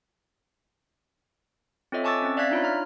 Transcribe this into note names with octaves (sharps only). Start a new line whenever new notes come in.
C4 F4 A4 C#5 D#5 E5
G#5 A5 C#6 D6 E6 A6
C4 C#4
D5 E5 F5 F#6 G#6 B6
D4 D#4 F4 C#5 B5
A#5 F6